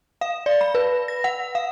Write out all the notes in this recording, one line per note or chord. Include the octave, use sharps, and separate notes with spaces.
F5
D5
B5
B4
A#6
F#5
F5